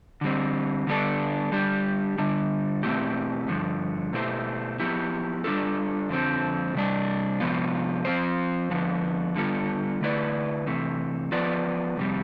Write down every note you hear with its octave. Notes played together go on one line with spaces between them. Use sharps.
D3 G3 C4
D3 G3 B3 D4 A4
D3 G3 D4 G4
D3 G3 D4
B2 A3 C4 E4 G4
G2 D3 F3
B2 A3 E4 G4 C5
F3 B3 E4 G4
G3 D4 F4 A4
F2 D3 F3 C4
C3 G3 D4
C3 F3 B3 F4
F3 C4 F4 C5
F2 D3 F3 B3
D3 G3 B3 F4 A4
D3 A3 E4 B4 D5
C3 E3 A3
F3 B3 F4 B4 D5
F2 C3 G3